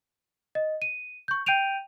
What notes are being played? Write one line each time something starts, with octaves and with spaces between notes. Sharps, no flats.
D#5
D#7
C#6 G6
G5 G6 D7 D#7 F7